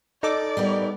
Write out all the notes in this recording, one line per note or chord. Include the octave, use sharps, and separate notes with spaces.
D#4 A4 D5 D6
G3 B3 A#4